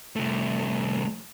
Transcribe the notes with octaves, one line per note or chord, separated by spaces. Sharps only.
C2 A3